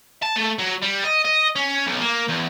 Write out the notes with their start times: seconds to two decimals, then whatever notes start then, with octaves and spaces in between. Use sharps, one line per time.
0.22 A5
0.36 A3
0.59 F#3
0.82 G3
1.04 D#5
1.25 D#5
1.56 C#4
1.87 B1
2.01 A#3
2.28 E2